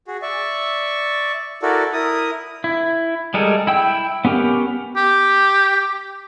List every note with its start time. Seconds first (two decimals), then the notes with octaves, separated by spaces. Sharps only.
0.07 F#4 G#4
0.22 D5 E5 C#6
1.62 E4 F#4 A4 A#4 D5
1.93 E4 A#4 D#6
2.64 E4
3.34 G3 G#3 A4 A#4
3.67 E4 G5 E6
4.25 B3 C#4 G4 A#4
4.96 G4